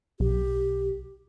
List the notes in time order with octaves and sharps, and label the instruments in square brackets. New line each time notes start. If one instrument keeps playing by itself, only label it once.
[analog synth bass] B1 [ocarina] G4